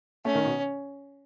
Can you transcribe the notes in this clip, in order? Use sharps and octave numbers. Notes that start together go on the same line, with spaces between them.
A3 C#4
D#3
B2